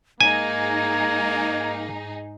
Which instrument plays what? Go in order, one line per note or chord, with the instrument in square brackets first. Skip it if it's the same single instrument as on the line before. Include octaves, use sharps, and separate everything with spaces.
[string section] G#2 D#4 G#4 [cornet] A#3 [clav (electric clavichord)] G#5 [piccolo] G#6